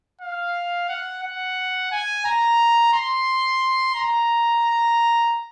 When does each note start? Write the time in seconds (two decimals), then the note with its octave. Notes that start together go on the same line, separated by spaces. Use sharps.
0.21 F5
0.89 F#5
1.23 F#5
1.92 G#5
2.25 A#5
2.93 C6
3.95 A#5